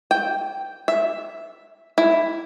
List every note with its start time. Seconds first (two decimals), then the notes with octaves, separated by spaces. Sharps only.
0.11 G5
0.88 E5
1.98 E4